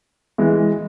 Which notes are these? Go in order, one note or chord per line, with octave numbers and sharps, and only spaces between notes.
E3 G#3